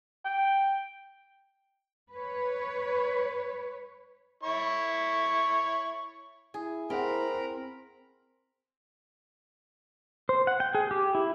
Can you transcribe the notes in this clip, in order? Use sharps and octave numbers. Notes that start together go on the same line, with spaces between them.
G5
B4 C#5
E4 C#5 C#6
E4 G#4
C4 G#4 A#4 F#5 A#5 B5
C5
F#5
G5
G#4
G4
E4